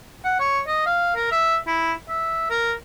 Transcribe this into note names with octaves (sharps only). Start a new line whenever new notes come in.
F#5
C#5
D#5
F5
A#4
E5
E4
E5
A#4